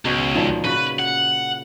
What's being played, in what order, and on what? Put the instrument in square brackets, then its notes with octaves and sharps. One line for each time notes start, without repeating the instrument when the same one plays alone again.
[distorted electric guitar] C#2 [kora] B2 C#4 G#4
[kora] A#2 D#3 F3
[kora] C#3 F#4 [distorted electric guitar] B4
[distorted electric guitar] F#5